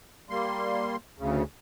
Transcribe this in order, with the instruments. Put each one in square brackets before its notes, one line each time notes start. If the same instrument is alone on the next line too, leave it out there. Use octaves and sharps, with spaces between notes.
[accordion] G3 A#3 C6
D2 C#3